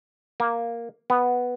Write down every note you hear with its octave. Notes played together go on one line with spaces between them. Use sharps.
A#3
B3